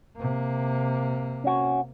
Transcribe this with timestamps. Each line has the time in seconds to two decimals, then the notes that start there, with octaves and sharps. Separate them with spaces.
0.17 C3 A#3
1.44 C#4 F#4